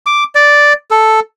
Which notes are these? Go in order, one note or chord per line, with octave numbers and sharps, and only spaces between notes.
D6
D5
A4